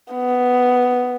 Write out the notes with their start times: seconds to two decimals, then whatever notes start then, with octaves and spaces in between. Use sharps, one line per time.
0.14 B3